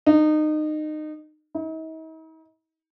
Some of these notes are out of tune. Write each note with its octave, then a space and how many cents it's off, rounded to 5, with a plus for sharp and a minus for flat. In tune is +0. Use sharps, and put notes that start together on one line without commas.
D#4 -25
D#4 +45